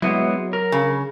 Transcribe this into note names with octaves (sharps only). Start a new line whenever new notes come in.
F#3 G#3 B3 E4
A#4
C#3